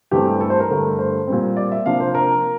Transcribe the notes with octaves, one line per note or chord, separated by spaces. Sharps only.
G2 E3 A3 C4 G4
A4
C5
A#4
G2 D3 A3
C5
A#2 G3 C4
D5
E5
C3 F3 A#3 D4 F5
C5
A#4